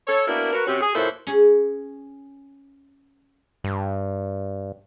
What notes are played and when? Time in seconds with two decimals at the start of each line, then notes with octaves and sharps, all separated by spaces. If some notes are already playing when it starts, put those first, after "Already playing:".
0.08 A4 C#5
0.27 A#3 B3 D4 E4 F#4 A#4
0.53 F#4 A#4 B4
0.66 C3 C4 C#4 F#4 G4
0.80 G#4
0.94 F#2 A#2 E4 A4 C5
1.27 C#4 G#4
3.64 G2